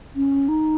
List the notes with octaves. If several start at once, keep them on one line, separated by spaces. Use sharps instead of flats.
C#4
D#4